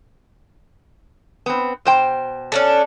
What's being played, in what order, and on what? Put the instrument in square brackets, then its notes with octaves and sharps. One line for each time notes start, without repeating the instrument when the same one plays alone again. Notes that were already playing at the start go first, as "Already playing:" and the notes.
[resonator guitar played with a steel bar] B3 C4
B2 C5 G5
[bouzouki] C#4 D4 A4